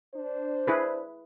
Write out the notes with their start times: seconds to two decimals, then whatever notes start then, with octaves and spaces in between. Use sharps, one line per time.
0.15 D4 C5
0.67 E4 G#4 B4